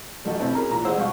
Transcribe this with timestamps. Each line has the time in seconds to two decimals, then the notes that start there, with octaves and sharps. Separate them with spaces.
0.25 A1 F#2 A3 F#4 A4 D#5
0.40 B2 A3 C4 C#4 E4
0.54 C#4 G#4 A#4 A#5
0.69 A#2 E3 A#5
0.84 A1 G#4 C5 F#5 E6
0.97 B2 G3 G4 F5 F#5 C#6